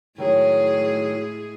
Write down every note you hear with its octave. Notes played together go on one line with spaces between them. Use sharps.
A2 D#3 F#3 G#3 G#4